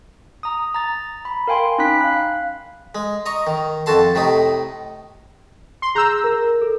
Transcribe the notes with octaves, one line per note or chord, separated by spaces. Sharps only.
A#5 D#6
A#5 A6
B5
A#4 F5 G5 G#5 C6
C#4 D#4 G5 B5 F#6 B6
F5 F#6
G#3
D#5 A#5 C#6
D#3
F2 F#4 A4 A5 C6
A2 C3 A3 D#4
C6
G#4 A#5 E6 F#6 G6
A#4
A4